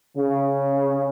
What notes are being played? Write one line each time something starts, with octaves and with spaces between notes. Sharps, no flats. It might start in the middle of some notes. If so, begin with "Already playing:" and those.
C#3